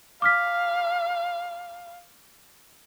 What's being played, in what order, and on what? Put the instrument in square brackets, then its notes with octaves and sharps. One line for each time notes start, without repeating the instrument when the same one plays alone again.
[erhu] F5 [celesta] D6 F6 B6